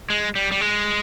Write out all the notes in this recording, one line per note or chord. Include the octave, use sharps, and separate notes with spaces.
G#3
G3
G3
G#3